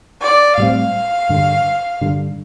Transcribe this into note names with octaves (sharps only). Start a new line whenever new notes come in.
D5
A2 G3 C4 F5
G2 D3 G3
G2 D3 G3